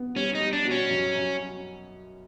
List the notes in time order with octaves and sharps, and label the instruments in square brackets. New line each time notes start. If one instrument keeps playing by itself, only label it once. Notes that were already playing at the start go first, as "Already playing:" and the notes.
Already playing: [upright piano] B3
[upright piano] G3 [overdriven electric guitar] C#4
[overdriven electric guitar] D#4
[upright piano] G3
[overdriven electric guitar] D4
[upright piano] B2
[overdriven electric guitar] C#4
[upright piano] F#2
F#2